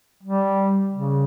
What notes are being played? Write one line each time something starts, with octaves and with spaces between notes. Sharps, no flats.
G3
C#3